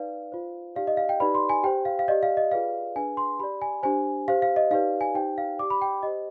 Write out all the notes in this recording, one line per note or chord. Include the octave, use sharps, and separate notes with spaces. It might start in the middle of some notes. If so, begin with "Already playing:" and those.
Already playing: D#4 B4 D5 F5
F4 C5
D#4 G4 D5 F5
D#5
F5
G5
D#4 G4 B4 D5 B5
C6
G#5
G4 C5 G5
F5
F5
G4 D5 D#5
F5
D#5
F4 G#4 B4 D5 F5
D4 G#4 B4 G#5
C6
G4 D5 B5
G#5
D4 G4 C5 G#5
G4 C5 F5
F5
D#5
D#4 G4 B4 D5 F5
G#5
D#4 G4 C5 G5
F5
G4 D5 D6
B5
G5
G4 C5 D#5